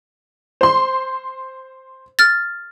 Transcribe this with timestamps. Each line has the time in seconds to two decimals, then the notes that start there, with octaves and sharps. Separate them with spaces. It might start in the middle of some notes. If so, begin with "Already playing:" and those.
0.61 C5 C6
2.19 F6 A6